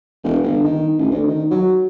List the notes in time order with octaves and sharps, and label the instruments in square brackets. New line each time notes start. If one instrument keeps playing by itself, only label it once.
[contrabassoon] E1
G1
D#3
A1
D2
D#3
F#3